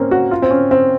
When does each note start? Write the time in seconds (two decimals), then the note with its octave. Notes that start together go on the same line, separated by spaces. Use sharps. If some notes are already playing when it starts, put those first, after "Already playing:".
Already playing: A#3 C4 C#4
0.11 F#4
0.31 F4
0.42 C4
0.51 C#4
0.71 C4